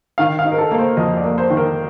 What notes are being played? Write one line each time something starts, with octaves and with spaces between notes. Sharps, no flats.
D#3 F5
F5
D#4
A#4
A4
A#3
C5
F2 D#5
D5
A#3
C5
D#3
A#4